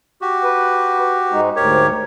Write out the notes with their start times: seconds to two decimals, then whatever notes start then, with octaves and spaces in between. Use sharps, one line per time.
0.21 F#4 G4
0.44 B4
1.32 G#2 G#3 D#4
1.56 D2 G#2 G4 A#4 C#5